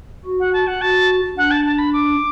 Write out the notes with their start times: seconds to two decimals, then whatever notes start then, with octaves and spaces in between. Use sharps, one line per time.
0.25 F#4
0.40 F#5
0.53 A5
0.67 F#5
0.81 F#4 A5
1.37 D4 F#5
1.51 A5
1.66 A5
1.79 B5
1.93 D6